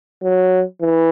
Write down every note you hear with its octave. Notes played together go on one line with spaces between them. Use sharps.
F#3
E3